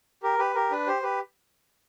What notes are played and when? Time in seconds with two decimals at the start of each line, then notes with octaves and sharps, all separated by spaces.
0.23 G4 A#4
0.39 G4 B4
0.55 G4 A#4
0.71 D4 B4
0.87 G4 C5
1.02 G4 B4